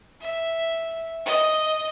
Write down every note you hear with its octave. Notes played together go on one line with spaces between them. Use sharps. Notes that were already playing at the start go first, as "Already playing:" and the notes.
E5
D#5